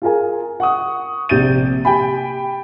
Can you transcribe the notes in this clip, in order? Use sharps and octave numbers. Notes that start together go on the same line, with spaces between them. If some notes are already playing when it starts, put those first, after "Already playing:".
F4 G#4 A#4 G#5
F#5 C#6 D#6
A#1 C3 G6 A6 D#7
G4 G5 G#5 B5